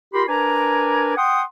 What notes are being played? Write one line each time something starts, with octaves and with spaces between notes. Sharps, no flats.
F4 G4 A#4 B5 C6
D4 A#4 B4 D5 G#5 A#5
F#5 G5 C6 D#6